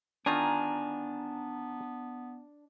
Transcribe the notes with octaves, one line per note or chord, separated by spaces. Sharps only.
D3 D#3 B3 D4 F4 G#5 A#5